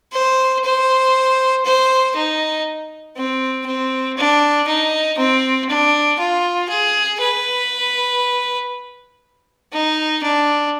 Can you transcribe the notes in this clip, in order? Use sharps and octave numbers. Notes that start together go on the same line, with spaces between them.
C5
C5
C5
D#4
C4
C4
D4
D#4
C4
D4
F4
G#4
B4
D#4
D4